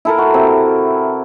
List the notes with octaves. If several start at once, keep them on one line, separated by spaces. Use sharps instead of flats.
E4 A4 A#4
F#4
C3